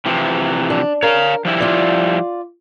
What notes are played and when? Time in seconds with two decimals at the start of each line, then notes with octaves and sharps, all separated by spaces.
0.06 C3 E3 F3
0.70 D4
1.03 A#4 C#5 F5
1.45 F3 G3 E4
1.60 F4 D5